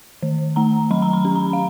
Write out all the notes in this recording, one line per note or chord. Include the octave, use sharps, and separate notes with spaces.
D#3
A3 A#5
F#3 B5
A#5
B5
C#4
A#5
F5